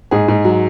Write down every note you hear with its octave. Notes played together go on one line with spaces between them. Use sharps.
G#2 G#4
G#2
F#3